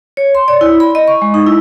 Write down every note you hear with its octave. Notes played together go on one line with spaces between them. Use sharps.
C#5
C6
D5
E4
B5
D#5
C#6
G#3
D#4
E4